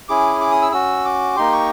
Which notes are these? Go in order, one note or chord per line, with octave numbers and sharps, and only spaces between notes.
C#4 E4 G#4 D6
D6
D#6
E6
C#4 F#4 E6
D6
A#3 D#4 G4 C6
C#6